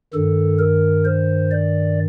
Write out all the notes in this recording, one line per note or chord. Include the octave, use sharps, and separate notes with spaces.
G2 D#3 A4
A#4
C5
D5